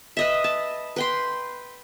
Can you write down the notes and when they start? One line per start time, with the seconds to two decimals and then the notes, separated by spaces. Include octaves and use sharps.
0.17 B4 D#5 E5
0.44 A5
0.96 B4 G5 C6